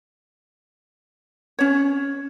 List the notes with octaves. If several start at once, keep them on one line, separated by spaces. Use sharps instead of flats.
C#4 C#5